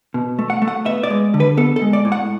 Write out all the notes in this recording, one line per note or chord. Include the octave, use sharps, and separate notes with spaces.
B2
A3
F#5
A3
F#5
B3 E5
D5
G#3
D3
B4
B3 A4
A4
G#3
D5
A2
F#5